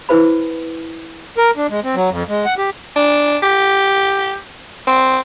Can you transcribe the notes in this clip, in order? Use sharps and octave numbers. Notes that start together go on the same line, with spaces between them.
E4 B4 C5 B5
A#4
D4
G#3
C4
F#3
F2
G#3
F#5
G4
D4
G4
C4